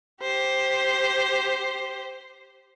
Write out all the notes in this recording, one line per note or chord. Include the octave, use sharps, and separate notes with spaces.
G4 C5